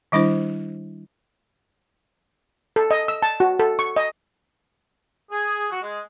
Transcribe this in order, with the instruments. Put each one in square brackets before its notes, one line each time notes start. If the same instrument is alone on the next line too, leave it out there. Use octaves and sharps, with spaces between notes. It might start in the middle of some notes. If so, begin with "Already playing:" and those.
[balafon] D#3 G3 D4 E4 C5
[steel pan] A4
D#5
E6
A5
F#4
A4
C#6
D#5
[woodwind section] G#4
F#4
G#3